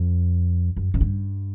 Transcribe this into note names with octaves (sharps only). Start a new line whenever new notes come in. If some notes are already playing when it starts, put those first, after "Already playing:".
Already playing: F2
F#2
F#2
G2